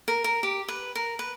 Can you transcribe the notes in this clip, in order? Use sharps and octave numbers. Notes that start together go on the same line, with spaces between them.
A#4
A#4
G4
B4
A#4
B4